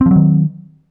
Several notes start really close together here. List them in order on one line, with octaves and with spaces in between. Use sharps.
C4 F3 F#3 D#3